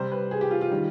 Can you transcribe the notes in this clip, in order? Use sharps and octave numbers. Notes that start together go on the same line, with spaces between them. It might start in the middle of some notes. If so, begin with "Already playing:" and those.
Already playing: C3 G3 C5
B4
G#4
G4
F4
F4
D#3 G3